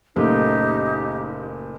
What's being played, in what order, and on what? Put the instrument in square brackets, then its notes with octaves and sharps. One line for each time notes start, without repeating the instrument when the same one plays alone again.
[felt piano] F#1 A#2 A3 [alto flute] D#4 [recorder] G4